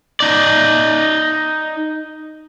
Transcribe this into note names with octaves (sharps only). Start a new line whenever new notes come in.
D#4 D5